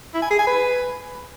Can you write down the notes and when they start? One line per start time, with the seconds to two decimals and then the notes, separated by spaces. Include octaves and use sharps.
0.14 E4
0.22 G#5
0.30 G#4
0.39 G#5
0.47 B4